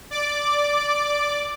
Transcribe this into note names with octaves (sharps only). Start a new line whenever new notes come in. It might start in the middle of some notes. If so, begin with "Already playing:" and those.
D5 D6